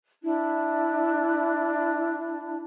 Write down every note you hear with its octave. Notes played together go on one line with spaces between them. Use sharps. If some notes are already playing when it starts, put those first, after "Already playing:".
D4 E4